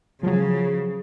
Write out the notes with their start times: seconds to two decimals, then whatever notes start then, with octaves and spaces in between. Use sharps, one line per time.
0.23 C#3 F3 F#3